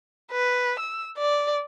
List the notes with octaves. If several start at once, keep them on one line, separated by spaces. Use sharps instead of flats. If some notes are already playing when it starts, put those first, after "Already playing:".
B4
E6
D5